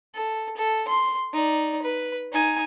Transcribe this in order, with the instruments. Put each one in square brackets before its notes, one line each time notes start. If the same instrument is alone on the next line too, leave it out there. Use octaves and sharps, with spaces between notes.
[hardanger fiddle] A4
A4
C6
D#4 D5
B4
D#4 G#5